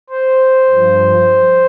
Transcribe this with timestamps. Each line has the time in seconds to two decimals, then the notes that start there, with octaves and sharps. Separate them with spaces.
0.10 C5
0.70 G2 F3